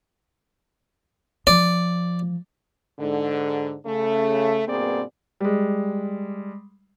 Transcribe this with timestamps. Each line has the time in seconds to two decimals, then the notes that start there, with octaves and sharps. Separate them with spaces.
1.47 F3 D5
2.99 G#2 D3
3.86 C#3 A3
4.67 G2 B2 A#3 C4 G#4 D5
5.40 G3 G#3